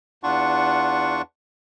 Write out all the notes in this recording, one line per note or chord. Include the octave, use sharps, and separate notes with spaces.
E2 D4 F4 F#5 C#6